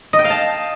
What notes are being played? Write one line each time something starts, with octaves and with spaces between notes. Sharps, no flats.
D#5
G5
F5
A5